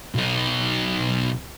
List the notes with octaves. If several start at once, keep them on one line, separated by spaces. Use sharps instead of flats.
B1 D#4